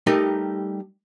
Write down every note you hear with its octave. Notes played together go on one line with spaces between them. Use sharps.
G3 A3 D#4 G4 A#4 D#5